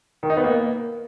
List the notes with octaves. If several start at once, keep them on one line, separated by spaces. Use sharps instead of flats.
D#3
D#4
B3
A#3